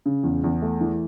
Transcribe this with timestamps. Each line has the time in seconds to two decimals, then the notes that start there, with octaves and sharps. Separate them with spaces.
0.06 C#3
0.23 E2
0.44 E2
0.62 A3
0.81 E3